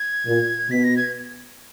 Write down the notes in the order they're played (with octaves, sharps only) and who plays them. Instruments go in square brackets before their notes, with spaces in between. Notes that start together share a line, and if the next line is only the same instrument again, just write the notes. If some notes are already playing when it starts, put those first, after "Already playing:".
Already playing: [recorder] G#6
[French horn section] A#2
[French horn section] B2 [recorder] B6
[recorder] A#6
G#6